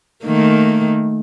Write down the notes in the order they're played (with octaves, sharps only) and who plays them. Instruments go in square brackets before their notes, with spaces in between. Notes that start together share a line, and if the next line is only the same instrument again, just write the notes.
[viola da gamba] D#3 A3 A#3